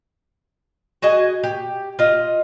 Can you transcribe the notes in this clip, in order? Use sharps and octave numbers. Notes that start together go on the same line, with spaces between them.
F#4 G#4 D#5 G#5
G4
F4 D#5